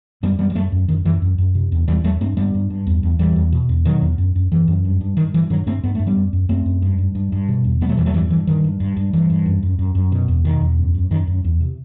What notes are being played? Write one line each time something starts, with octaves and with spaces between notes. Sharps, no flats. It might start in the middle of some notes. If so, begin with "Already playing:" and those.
F#2 G3 B3
F#2 G3 B3
G3
F#2 F#3 A3
F#2
F#2 D#3
F#2 E3
F#2
F#2
C3
E2
E2 E3 G3
E2 F#3 A3
G2 A3 C4
G2 G3 B3
G2
G2
E2
E2
E2 E3 G3
E2
B2
E2
B2 D#3 F#3
E2
F#2
F#2
F#2 E3
F#2
G2
G2
G2 D#3
G2 E3
G2 D#3 F#3
G2 A3 C4
G2 B3
G2 A3
G3 B3
F#2
F#2
F#2 A3 C4
F#2
G2
G2
G2
G2
B2
E2
B2 G3 B3
F#3 A3
E2 E3 G3
F#3 A3
G2 E3 G3
G2 E3
G2 D#3
G2
G2
G2
G2 E3
G2
F#2
F#2
F#2
F#2
B2
E2
B2 D#3
E2
F#2
F#2
F#2 D#3
F#2
E2
C3